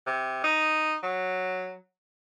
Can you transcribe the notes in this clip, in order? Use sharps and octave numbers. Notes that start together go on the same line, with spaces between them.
C3
D#4
F#3